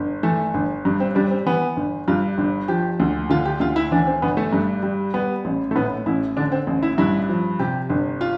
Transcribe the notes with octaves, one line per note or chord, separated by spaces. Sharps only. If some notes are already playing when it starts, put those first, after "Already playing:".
Already playing: G1
E3 A3
G1
G2
C4
G3 D4
C4
E3 B3
G1
G2 F4
G1
F3 G4
D2
D3 F4
G4
D2 F4
E4
E3 D4
C4
G1 B3
A3
G2
G3
G3 B3
A1
A3
A2 B3
A1 E4
D3 D4
C4
A1
E4
G2 E4
F3
C3 G4
G1
F4